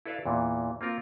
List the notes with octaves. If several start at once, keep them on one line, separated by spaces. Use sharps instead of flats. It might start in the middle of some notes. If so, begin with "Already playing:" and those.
E4 A4 B4 D5 E5 F5
E2 A#2 E3
A#3 C4 F4 A#4